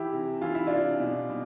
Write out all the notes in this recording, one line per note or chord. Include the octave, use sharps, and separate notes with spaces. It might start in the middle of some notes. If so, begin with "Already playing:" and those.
Already playing: E3 E4 G4
C3
E3 F4
E4
C3 D4 F4
B2
B2